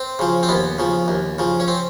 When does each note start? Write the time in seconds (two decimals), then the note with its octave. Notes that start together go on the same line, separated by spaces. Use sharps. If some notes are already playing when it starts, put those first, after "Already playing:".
Already playing: C4
0.19 C#3 F3
0.43 C4
0.49 D#2 B3
0.79 C#3 F3
1.08 D#2
1.39 C#3 F3
1.60 C#4
1.68 C4